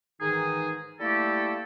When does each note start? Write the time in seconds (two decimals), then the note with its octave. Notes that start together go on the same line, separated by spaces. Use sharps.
0.20 G#2 D#3 E3 D#4 G#4
1.00 G3 A3 A#3 E4 G4 A4